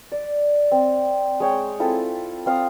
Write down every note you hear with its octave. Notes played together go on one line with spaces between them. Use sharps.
D5
C4
G#3 C#5 G5
C4 E4 F4 A4
C4 F5 D#6